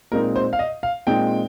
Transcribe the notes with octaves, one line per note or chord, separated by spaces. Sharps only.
A#2 G#3 C4 D#4 A#4
C5
F5
D#5
F5
A#2 G#3 C4 D#4 G5